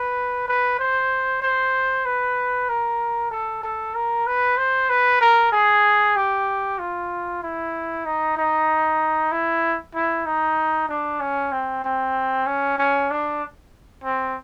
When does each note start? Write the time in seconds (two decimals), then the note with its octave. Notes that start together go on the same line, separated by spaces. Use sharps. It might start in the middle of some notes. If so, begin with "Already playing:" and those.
Already playing: B4
0.48 B4
0.79 C5
1.42 C5
2.06 B4
2.69 A#4
3.31 A4
3.63 A4
3.95 A#4
4.27 B4
4.57 C5
4.90 B4
5.21 A#4
5.52 G#4
6.16 G4
6.79 F4
7.43 E4
8.05 D#4
8.37 D#4
9.32 E4
9.95 E4
10.26 D#4
10.89 D4
11.20 C#4
11.52 C4
11.84 C4
12.46 C#4
12.78 C#4
13.11 D4
14.04 C4